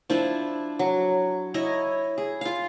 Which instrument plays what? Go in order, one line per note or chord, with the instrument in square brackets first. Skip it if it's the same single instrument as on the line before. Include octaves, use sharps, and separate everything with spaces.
[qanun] F3 D4 E4
F#3
E4 C#5 D#5
G#4
F4 F5